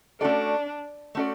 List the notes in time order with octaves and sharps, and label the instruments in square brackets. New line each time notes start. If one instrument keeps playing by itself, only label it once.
[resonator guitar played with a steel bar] A3 C#4 F#4 A4 D5 [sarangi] D4
[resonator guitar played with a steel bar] A3 C#4 F#4 A4 D5